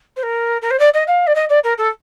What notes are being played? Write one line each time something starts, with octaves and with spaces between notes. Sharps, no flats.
C5
A#4
A#4
C5
D5
D#5
F5
D5
D#5
D5
A#4
A4